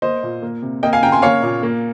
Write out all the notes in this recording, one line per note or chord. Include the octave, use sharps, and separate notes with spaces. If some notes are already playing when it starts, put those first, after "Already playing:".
A#3 C5 D#5
A#2
A#3
C3
A#3 D#5 G5
F5 G#5
C#3 G5 A#5
G#5 C6
A#3 C#5 F5
A#2
A#3